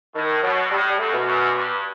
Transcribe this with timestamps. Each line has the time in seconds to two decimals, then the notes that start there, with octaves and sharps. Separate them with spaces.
0.15 A2 D#3
0.43 B2 F#3
0.70 A2 G3
0.90 G3
0.98 F#2 A3
1.13 B2
1.27 F#2
1.56 G2